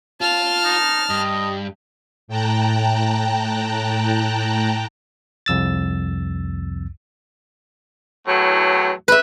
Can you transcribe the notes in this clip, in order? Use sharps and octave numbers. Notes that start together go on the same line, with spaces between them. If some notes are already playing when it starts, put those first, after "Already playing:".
F4 A5 F6
D#4
G2 D#5
A2 G5 A5 A#5 F#6
C2 F2 E6 A6
E2 A2 F#3
B4 E5